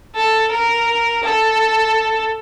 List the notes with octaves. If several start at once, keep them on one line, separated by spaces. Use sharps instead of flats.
A4
A#4
A4